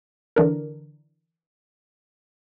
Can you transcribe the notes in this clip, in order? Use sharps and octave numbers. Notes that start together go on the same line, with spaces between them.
D3 E3 D4 A#4